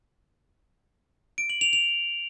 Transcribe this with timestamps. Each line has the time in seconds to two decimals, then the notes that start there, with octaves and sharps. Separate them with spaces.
1.38 D7
1.50 F#7
1.61 F7
1.73 F7